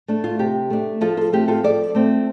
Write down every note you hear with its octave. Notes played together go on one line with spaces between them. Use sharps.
A3 D4
F4
C3 G4
A3 D4
F3 F4 A4
F4 A4
A3 C4 F4 G4
F4 A4
F3 A4 D5
A3 C4 F4